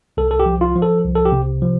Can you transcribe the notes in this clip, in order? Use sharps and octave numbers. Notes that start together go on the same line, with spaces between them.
C2 A4
A4
G4
F3
F4
F3
A4
C2
A4
G4
C3
F3